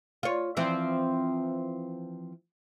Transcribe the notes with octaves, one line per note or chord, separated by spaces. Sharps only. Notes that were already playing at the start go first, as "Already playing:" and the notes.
F4 C#5
E3 F3 C4